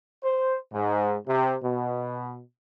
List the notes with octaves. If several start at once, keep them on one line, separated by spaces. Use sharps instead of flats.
C5
G#2
C3
B2